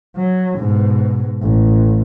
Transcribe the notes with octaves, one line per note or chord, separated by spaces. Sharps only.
F#3
G#2 B2
A1